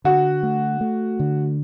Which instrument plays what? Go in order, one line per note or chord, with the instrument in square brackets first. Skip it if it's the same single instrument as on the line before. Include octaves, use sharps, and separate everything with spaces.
[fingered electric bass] D3 [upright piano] F#4
[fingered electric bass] A3
A3
D3